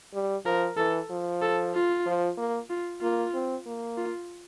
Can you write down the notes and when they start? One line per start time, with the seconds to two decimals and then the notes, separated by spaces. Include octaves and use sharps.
0.14 G3
0.45 F3 A#4
0.77 E3 A4
1.10 F3
1.42 A4
1.74 F4
2.06 F3
2.38 A#3
2.70 F4
3.01 A#3 F4
3.34 C4
3.66 A#3
3.97 F4